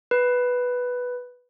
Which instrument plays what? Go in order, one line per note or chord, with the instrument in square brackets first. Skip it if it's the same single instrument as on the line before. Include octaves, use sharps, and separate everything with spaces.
[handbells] B4